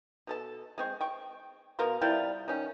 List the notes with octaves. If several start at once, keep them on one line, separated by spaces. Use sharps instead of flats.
B2 A4 A5
G#3 C4 C#6
G5 C#6
B2 A#4 F5 C6
C3 G3 E4 F4
D#3 C#4